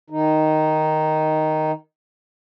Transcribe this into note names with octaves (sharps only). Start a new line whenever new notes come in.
D#3 D#4